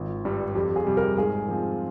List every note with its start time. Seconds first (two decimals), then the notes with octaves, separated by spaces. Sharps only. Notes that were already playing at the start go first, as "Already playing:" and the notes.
Already playing: G#1 F4
0.25 G2 G3
0.55 F2 G4
0.76 G#4
0.87 C3 G3
0.97 A#4
1.17 G#2 G#4
1.48 F3 C4 F4